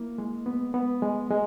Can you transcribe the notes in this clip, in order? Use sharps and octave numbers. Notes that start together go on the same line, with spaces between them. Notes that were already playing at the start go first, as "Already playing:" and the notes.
Already playing: A#3 E4
G#3
B3
B3
G#3
G#3